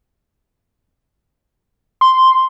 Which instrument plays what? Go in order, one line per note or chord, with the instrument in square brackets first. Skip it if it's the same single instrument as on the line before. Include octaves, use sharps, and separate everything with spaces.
[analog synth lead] C6